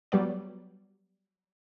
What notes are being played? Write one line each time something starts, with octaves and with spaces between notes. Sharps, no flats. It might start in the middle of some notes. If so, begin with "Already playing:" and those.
F#3 G3 B3 D5